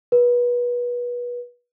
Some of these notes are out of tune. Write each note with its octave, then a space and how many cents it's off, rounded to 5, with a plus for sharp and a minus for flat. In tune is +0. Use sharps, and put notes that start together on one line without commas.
B4 -30